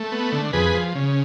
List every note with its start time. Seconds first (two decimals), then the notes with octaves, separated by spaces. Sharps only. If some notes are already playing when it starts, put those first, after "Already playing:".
Already playing: A3
0.12 B3
0.32 D3
0.53 F2 G#4 B4
0.74 F3
0.95 C#3